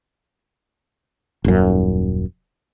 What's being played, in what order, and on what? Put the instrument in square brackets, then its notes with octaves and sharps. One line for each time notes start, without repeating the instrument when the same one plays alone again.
[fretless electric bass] D#1 F#2